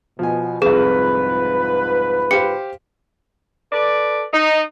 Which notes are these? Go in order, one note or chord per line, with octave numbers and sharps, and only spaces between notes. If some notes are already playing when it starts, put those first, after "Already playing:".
B2 F3 G#5
C2 F2 G#2 F4 G#4 B4
G4 C5 F5 C#7
A4 B4 D5
D#4